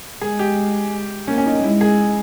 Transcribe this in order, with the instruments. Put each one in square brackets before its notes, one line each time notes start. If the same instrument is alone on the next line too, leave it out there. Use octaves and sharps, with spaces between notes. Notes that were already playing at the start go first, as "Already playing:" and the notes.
[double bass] G#3 [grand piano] G#4
[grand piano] G4
[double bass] A#3 [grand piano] C#4
[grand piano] C#4
D#4
[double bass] G#3 [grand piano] E4
[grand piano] G#4